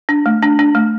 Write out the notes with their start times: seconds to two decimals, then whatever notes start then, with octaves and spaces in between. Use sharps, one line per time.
0.09 D4
0.26 A3
0.42 D4
0.59 D4
0.75 A3